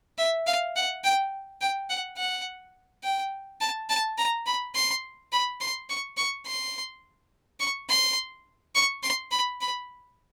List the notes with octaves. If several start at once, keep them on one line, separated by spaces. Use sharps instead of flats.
E5
F5
F#5
G5
G5
F#5
F#5
G5
A5
A5
A#5
B5
C6
B5
C6
C#6
C#6
C6
C#6
C6
C#6
C6
B5
B5